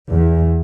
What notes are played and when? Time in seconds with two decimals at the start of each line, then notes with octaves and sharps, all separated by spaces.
0.11 E2